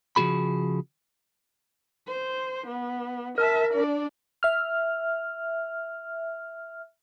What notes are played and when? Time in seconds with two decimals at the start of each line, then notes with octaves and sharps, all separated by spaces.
0.16 C#3 F3 G3 F#4 G#4 B5
2.07 C5
2.67 B3
3.38 A#4 E5 A5
3.73 D4 D5
4.43 E5 F6